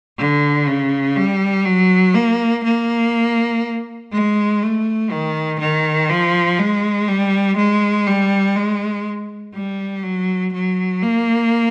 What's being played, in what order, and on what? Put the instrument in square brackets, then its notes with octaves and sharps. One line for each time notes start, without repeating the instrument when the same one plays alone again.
[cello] D3
C#3
G3
F#3
A#3
A#3
G#3
A3
D#3
D#3
F3
G#3
G3
G#3
G3
G#3
G3
F#3
F#3
A#3